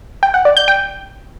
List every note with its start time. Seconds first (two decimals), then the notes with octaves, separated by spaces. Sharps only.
0.23 G5
0.34 F#5
0.45 D5
0.57 G6
0.68 G5